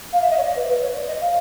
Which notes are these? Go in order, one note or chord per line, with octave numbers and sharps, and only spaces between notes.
F5
E5
D#5
C#5
D5
B4
C5
B4
C#5
D5
D#5
F5